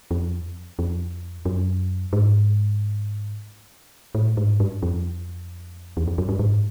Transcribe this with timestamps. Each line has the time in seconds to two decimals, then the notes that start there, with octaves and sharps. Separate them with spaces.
0.11 F2
0.79 F2
1.45 F#2
2.13 G#2
4.15 A2
4.37 G#2
4.60 G2
4.83 F2
5.97 E2
6.08 F2
6.18 F#2
6.29 G2
6.39 G#2